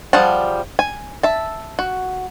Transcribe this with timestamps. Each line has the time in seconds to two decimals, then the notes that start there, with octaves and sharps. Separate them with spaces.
0.13 F3 G3 G#4 F#5 A5
0.79 G#5
1.23 E5 A5
1.79 F#4